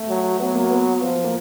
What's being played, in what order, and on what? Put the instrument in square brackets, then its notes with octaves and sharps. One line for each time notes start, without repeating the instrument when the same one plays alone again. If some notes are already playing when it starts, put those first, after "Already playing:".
Already playing: [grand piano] A3
[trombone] F#3
[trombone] F#3 [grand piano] B3
[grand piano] A#3
B3
[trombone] F3 [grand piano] B3
[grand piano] A#3